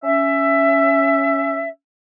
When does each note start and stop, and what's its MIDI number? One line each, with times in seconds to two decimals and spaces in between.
0.04 1.68 61
0.04 1.68 76